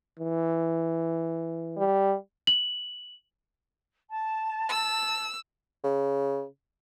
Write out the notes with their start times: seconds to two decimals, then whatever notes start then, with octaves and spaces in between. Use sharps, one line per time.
0.19 E3
1.77 G3
2.47 F#7
4.10 A5
4.69 E6
5.84 C#3